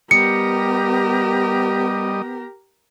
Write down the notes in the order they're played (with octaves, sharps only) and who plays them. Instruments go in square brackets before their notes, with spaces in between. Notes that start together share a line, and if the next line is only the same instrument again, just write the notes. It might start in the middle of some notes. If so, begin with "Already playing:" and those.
[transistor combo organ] G3 D#5 [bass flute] B3 [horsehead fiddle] G4 A#4 [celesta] C#7